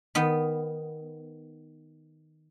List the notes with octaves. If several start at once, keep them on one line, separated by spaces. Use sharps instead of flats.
D#3 B3